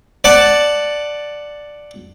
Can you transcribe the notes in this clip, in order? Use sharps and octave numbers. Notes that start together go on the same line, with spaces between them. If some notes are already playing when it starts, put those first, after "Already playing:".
D5 F#5 A5